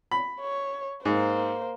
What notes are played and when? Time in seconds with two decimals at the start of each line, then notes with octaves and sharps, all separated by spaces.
0.11 B5
0.41 C#5
1.05 G#2 A#3 C5